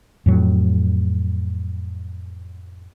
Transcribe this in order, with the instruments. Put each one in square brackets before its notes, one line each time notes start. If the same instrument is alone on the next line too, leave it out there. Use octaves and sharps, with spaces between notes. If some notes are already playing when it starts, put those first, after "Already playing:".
[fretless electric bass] F2 A2 F#3